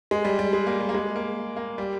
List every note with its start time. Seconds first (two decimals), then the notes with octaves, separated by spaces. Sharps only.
0.11 G#3
0.25 G3
0.39 G3
0.53 G#3
0.67 A#3
0.81 G3
0.89 A#3
0.95 G#3
1.16 A#3
1.57 A#3
1.78 G3